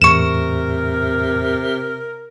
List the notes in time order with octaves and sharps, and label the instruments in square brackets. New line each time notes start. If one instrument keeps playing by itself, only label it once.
[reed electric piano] E2 A2 [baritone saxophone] C3 [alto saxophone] A#4 [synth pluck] C#6 E7